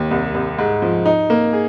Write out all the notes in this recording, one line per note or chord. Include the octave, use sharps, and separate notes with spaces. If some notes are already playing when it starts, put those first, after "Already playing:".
Already playing: D#2
C2
C2
G#2
F3
D#4
A#3
G#4